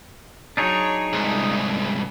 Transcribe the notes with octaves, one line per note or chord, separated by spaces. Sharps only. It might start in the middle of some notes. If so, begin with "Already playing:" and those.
F#3 D4 D#4 G#4 C#5
C2 G#2 G#3